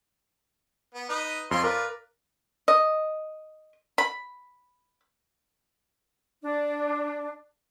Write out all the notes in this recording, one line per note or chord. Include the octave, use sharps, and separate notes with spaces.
B3
D#4 B4 D#5
F2 F4 C#5 C6
F4 A#4 B4 D5
D#5
B5
D4